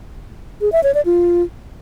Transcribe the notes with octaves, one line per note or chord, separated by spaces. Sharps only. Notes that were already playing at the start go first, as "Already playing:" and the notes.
G#4
E5
C#5
D5
F4